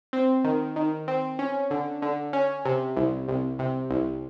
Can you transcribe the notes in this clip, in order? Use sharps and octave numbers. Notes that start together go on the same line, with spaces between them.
C4
D#3
D#3
C4
C#4
D3
D3
C#4
C3
C2
C2
C3
C2